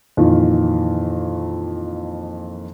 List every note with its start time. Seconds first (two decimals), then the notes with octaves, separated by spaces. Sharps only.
0.17 F2 A#2 D#3 E3